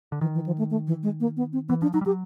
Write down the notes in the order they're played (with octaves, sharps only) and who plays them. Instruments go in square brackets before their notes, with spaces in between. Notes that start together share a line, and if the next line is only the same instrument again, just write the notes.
[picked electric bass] D3
[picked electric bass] D#3 [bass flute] E3
[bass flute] E3
F3
A3
A3
E3
G#3
A#3
B3
C4
[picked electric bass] E3 [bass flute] B3
[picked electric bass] F3 [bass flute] D4
[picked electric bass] F#3 [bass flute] D#4
[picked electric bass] G3
[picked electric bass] F#3 [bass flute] G4